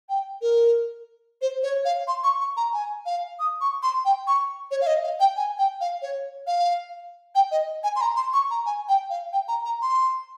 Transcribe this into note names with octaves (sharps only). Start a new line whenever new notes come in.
G5
A#4
C5
C#5
F5
C6
C#6
C#6
A#5
G#5
F5
D#6
C#6
C6
G5
C#6
C#5
F5
D#5
F5
G5
G#5
G5
F5
C#5
F5
G5
D#5
G#5
C6
A#5
C6
C#6
A#5
G#5
G5
F5
G5
A#5
A#5
C6